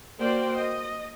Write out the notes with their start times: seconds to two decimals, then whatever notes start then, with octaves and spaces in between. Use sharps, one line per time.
0.20 A#3 F#4 C5 D5 G5 C6
0.57 D#5